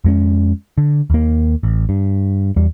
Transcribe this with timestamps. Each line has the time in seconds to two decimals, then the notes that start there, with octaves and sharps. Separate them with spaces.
0.05 F2 G#3 C#4
0.78 D3
1.10 D#2 A#3
1.63 A1
1.89 G2
2.56 E2 G3